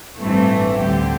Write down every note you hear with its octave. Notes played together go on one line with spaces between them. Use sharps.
A1 G2 E3 A3 C4
D2 D3 G3 C4 G4